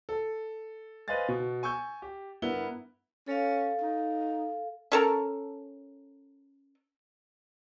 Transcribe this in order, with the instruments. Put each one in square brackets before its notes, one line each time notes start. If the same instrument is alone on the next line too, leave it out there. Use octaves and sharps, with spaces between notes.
[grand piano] A4
B4 C5 D#5 F5 G#5 A6
B2
G#5 C#6 E6 G6
G4
G2 B3 E4 A#4 F#5 G7
[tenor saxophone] C#4 [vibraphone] A4 F5
[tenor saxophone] D#4
[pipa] C#4 A4 A#4